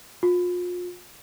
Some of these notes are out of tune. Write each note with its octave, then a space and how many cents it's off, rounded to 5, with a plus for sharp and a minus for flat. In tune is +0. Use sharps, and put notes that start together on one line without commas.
F4 +35